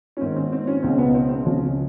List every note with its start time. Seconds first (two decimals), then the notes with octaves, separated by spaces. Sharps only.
0.17 C#4
0.21 G#2 D#3 C4
0.36 C4
0.52 C4
0.67 C#4
0.83 C#2 B2 C4
0.98 B3
1.14 C4
1.29 C4
1.45 C#2 C#3 F3 C#4